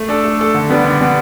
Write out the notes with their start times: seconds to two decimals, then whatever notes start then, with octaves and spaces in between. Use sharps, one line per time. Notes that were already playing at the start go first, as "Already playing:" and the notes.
Already playing: A3
0.09 D4 A4
0.24 A3
0.39 D4 A4
0.54 D3
0.70 G3 B3 D4
0.84 D3
1.00 G3 B3 D4